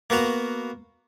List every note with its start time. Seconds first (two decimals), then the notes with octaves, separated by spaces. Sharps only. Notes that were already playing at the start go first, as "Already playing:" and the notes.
0.10 A#3 B3 F#4 A#5